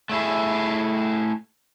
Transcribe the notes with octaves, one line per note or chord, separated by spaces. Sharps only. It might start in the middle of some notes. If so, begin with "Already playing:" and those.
A3 E4 G#4